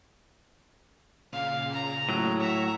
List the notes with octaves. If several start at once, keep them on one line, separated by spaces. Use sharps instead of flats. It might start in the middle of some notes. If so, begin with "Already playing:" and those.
A#2 C#3 F5
A#5
A2 F#3
E5 A#5 C#6